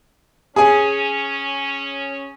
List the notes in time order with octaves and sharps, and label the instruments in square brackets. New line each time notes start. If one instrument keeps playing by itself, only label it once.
[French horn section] C#4 [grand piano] G#4 G#5